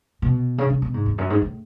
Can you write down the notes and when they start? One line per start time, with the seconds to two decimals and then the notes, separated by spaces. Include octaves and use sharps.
0.22 B2
0.58 C#3
0.70 C#3
0.82 B2
0.94 G#2
1.06 E2
1.18 F#2
1.30 G#2
1.42 A2